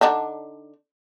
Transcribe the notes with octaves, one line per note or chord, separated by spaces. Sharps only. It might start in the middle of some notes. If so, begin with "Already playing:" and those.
D3 D4 D#4